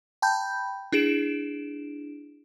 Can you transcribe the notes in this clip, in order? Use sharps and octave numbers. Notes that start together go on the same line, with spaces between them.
G5 A5 B5 G6
D4 E4 G#4 D7 E7